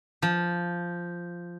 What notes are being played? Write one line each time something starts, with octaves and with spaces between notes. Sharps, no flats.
F3